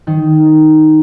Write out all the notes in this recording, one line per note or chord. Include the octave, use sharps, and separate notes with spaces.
D#3